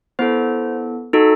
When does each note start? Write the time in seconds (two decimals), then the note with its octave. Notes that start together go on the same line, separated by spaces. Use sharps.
0.19 B3 E4 A4 C5
1.13 D#4 F#4 A4